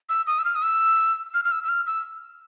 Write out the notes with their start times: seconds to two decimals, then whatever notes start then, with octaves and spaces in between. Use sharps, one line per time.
0.09 E6
0.27 D#6
0.38 E6
0.45 F6
0.55 D#6
0.63 E6
1.34 F6
1.45 F6
1.52 E6
1.64 E6
1.69 F6
1.87 E6